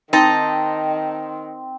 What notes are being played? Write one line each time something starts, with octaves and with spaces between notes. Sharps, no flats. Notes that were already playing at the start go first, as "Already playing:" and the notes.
D#3 C4 D#4 D#5 A5